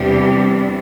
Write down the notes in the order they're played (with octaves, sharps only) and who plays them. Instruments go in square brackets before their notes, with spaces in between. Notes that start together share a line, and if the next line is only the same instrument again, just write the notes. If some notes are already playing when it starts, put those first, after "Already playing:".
Already playing: [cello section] E2 C3 E3 G3 D4 G4